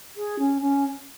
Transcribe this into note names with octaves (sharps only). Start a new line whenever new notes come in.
G#4
C#4
C#4